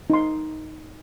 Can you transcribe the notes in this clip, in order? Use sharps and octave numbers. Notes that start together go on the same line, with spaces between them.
D#4 C6